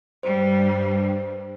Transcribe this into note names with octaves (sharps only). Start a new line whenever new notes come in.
G2 G3 C5